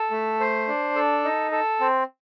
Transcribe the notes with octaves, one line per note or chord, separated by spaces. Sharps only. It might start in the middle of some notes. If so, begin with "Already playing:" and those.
Already playing: A4
A3
C5
D4
A4
D#4
A4
C4